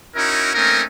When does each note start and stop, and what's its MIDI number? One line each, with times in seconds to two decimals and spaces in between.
0.15 0.51 61
0.15 0.51 63
0.15 0.51 64
0.15 0.51 66
0.15 0.51 70
0.54 0.82 57
0.54 0.82 58
0.54 0.82 60
0.54 0.82 61
0.54 0.82 63
0.54 0.82 70